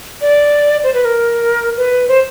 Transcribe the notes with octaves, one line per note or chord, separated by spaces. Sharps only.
D5
C5
B4
A#4
B4
C5